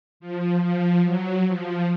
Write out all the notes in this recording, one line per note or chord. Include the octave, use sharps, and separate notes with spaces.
F3
F3
F#3
F3